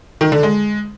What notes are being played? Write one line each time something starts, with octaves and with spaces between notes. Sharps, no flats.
D#3
D3
G#3